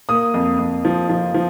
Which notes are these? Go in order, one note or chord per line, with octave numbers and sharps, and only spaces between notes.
A#3 D#6
F2
F2
F3
F3
F3